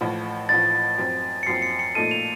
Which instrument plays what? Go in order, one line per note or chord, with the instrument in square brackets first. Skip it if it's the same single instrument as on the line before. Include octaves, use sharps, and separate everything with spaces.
[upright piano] A1 A2 F3
[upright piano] A1 A2 F3 [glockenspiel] A6
[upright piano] F#2 F3 C4
[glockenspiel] C#7
[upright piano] F#2 F3 C4 [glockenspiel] C7
[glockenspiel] C#7
C#7
[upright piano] A#2 F3 A3 D#4 A4 [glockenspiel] D#7
[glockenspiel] F7